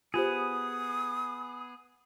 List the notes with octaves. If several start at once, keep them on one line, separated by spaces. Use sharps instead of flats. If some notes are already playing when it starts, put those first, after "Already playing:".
B3 F4 G4 G#4 C5 D#6